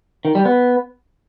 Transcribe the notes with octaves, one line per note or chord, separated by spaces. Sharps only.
D#3
G3
B3